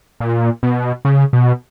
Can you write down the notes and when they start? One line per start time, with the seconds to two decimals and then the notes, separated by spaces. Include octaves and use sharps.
0.20 A#2
0.63 B2
1.05 C#3
1.33 B2